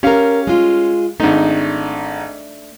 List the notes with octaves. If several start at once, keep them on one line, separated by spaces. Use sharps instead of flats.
C#4 G4 A#4 F5
G#3 F4
G#1 A3 D4 D#4